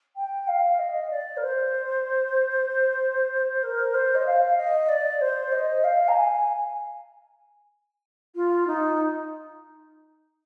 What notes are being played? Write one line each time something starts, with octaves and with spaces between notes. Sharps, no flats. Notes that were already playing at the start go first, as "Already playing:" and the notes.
G5
F5
D#5
D5
A#4
C5
A#4
C5
D#5
F5
D#5
D5
C5
D#5
F5
A#5
G#5
F4
D#4